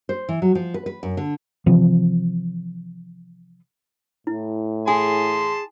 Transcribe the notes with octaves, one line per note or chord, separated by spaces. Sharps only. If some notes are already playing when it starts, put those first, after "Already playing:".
C5
E3
F#3
F3
B4
B4
F#2
D3
C3 E3 F3 C4
A2 E4
G#4 G#5 A5 C6